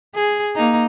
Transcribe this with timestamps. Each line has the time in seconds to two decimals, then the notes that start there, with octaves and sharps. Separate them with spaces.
0.15 G#4
0.56 A#3 D#4